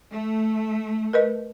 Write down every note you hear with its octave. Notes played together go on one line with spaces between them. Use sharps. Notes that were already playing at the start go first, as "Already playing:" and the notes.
A3
A#4 B4 D#5